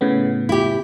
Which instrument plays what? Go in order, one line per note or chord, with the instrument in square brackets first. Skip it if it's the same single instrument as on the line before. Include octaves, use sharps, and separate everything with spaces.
[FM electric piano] A2 C#3 B3
[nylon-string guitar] E4 G4